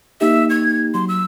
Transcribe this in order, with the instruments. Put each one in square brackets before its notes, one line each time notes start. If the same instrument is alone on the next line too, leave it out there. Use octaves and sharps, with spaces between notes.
[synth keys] A#3 D#4 G4 [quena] E5
[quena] G#6
[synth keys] F#3 [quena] C6
[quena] E6